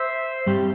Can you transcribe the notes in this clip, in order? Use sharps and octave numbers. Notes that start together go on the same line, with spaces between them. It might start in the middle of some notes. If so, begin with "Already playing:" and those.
Already playing: C5 E5
G2 G3 C4 G4